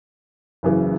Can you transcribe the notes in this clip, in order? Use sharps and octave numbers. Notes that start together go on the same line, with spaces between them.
F#1 F#2 C#3 E3